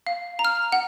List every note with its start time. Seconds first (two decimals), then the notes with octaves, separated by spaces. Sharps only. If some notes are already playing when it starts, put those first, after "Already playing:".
0.07 F5
0.39 A#5
0.45 F6
0.72 F#5